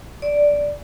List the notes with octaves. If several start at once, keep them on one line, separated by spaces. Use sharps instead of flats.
D5